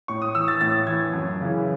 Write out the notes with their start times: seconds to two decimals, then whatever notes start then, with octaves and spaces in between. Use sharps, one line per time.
0.08 A2 C#6
0.22 D#6
0.35 E3 E6
0.48 A6
0.61 A2 A6
0.87 E3 G#6
1.13 F#2
1.41 C#3 E3